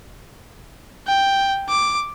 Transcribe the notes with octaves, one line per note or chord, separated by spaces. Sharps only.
G5
D6